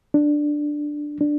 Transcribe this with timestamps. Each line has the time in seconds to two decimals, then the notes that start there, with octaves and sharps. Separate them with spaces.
0.14 D4
1.21 D4